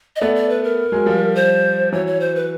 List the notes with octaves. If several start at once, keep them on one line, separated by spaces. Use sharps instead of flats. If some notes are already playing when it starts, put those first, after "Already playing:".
D#5
A3 B3 D5
D5
B4
A#4
F#3 G#3
F3 G3
C5
E3 F#3 C#5
C#5
C5
B4